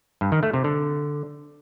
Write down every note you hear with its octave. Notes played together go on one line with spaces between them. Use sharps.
G2
D#3
A3
C3
D3